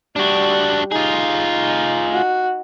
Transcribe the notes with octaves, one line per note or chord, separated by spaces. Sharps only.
G3 D4 F#4
D#4 F4 G#4
F#4